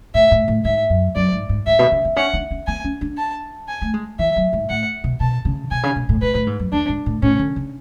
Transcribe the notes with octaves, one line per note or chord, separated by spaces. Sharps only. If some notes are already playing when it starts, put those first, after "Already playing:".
A2 E5
A2
A2
G#2 E5
F#2
F#2 D5
G#2
G#2
G#2 E5
B2
C#3
B3
C#4 F#5
D4
C#4
B3 G#5
C#4
D4
A5
G#5
A3
G#3
E3 E5
F#3
G#2
A2 F#5
B2
B2 A5
C#3
B2 G#5
C#3
B2
A2
A2 B4
A2
G#2
F#2
E2 D4
G#2
A2
A2 C#4
D3
C#3